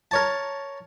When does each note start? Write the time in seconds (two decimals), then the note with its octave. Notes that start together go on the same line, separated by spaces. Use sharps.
0.11 A#4 C#5 A5